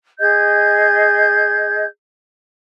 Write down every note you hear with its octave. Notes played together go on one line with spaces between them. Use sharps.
G#4 D#5 G6 G#6